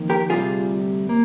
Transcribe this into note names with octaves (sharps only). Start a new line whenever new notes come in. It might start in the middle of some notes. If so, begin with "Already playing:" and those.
Already playing: F2 D#3 A#3
G4 A#4
D2 C3 G3 F4 G#4
A#3